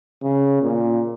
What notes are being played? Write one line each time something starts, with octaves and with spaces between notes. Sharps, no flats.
C#3
A#2